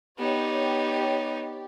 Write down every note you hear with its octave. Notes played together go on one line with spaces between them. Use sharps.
B3 D#4 G4 C#5 D5